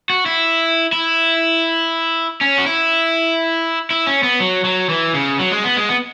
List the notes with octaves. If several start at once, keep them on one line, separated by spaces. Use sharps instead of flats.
F#4
E4
E4
C#4
F#4
E4
E4
C#4
B3
F#3
F#3
E3
C#3
F#3
G#3
B3
G#3
B3